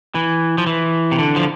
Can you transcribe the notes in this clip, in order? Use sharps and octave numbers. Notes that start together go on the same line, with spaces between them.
E3
F3
E3
C3
D3
F3